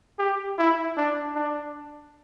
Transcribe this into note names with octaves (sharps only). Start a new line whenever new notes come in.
G4
E4
D4
D4